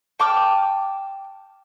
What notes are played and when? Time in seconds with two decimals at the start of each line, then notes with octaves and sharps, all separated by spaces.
0.20 G5 A5 D6 F6